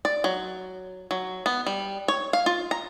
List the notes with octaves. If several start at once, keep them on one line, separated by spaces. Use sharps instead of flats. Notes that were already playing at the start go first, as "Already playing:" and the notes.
D5
F#3
F#3
B3
G3
C#5
F5
F4
A#5